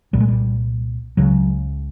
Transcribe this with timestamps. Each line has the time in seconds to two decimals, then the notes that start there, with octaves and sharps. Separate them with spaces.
0.13 C2 A#2 G3
0.20 G#3
0.28 G3
1.17 C#2 C#3 F#3